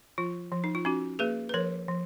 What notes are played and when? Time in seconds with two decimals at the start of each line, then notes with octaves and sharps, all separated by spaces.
0.18 F3 F4
0.52 F3
0.64 D#4
0.75 F4
0.85 C#4 D#4 F#4
1.19 A#3 G#4 B4
1.49 B4
1.54 F3 A#4 C#5
1.88 F3